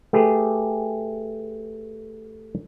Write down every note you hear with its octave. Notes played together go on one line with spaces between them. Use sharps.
A3 G4 G#4 B4